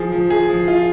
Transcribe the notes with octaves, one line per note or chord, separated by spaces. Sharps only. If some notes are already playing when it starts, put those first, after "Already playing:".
Already playing: F3 G#4
F3
G#4
F3
F4